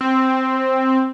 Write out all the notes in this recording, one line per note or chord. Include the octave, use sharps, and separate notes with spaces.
C4